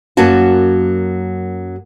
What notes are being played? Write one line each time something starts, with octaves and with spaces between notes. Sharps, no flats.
F#2 F#3 A#3 C#4 F#4 A5